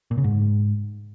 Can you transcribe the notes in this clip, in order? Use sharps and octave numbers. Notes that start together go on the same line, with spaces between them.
A#2
C#3
G#2